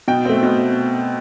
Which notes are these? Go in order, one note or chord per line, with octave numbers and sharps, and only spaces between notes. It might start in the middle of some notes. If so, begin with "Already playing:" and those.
B2 G5
A3 C4
B2